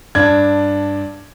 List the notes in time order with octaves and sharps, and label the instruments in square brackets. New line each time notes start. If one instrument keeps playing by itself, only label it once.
[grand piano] G2 D4 G#6